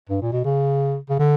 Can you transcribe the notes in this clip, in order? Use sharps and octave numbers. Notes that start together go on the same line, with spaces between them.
G2
A#2
B2
C#3
C#3
D3